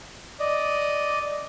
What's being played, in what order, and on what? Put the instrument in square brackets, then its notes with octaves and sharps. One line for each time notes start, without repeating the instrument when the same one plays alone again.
[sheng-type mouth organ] D5 D#5